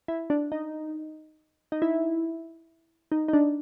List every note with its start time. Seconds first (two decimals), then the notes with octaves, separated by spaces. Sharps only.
0.08 E4
0.30 D4
0.52 D#4
1.72 D#4
1.82 E4
3.12 D#4
3.28 D#4
3.33 D4